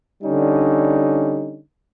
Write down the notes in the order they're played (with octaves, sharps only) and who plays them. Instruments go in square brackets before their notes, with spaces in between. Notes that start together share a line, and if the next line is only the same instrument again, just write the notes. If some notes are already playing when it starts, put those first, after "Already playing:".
[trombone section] D3 G3 C#4 D#4